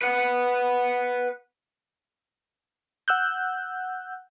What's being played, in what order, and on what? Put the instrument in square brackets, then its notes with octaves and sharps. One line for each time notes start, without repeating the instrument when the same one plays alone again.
[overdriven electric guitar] B4 F#5
[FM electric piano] F#5 E6 F#6 G6